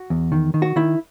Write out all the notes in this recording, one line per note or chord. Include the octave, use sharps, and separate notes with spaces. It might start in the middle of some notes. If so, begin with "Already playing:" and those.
Already playing: F#4
E2
D#3
D#3
F#4
D#3 E4